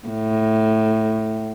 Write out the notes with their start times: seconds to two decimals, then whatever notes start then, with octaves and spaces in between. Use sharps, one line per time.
0.08 A2